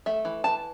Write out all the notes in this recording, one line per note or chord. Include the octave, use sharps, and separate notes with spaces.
A3 E5
E3
E3 A5